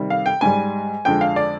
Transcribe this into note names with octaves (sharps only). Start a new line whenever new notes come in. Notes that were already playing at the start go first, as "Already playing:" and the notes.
Already playing: C3 D#3 G3
F5
G5
G#2 G3 G#5
F2 D3 G#3 G5
F5
D5